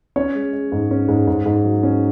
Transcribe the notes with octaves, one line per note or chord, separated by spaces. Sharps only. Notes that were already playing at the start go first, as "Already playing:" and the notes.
C#4 C#5
G#3
G#3
G#2
C#4
G#2
G#2
G#2
F#3
C#4